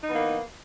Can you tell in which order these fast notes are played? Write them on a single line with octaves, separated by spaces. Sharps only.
D#4 E3 B3 A#3